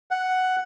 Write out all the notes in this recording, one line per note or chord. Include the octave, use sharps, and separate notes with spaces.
F#5